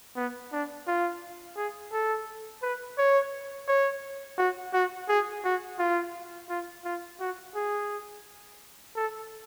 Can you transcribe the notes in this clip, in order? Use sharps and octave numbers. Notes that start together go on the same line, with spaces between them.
B3
D4
F4
G#4
A4
B4
C#5
C#5
F#4
F#4
G#4
F#4
F4
F4
F4
F#4
G#4
A4